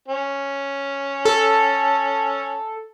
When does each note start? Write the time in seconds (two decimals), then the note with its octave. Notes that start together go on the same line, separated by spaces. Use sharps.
0.08 C#4
1.25 A4